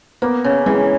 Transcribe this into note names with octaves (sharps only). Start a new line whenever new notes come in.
A#3 B3
C#3
E3 G#3